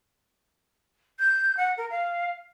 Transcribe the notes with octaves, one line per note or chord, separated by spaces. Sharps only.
G6
F#5
A#4
F5